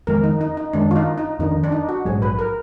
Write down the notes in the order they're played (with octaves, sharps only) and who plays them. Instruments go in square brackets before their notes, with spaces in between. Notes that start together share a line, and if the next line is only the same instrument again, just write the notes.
[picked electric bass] F2 D#3 G#3 B3 [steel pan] A#4
[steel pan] D#4
D#4
D#4
[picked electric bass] F#2 D#3 G#3 [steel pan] D4
[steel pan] F4
D#4
D#4
[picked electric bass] F2 D#3 A#3 D4 [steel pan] D#4
[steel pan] D4
D#4
F#4
[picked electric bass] A#1 G#2 F#3 [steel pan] G#4
[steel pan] B4
A#4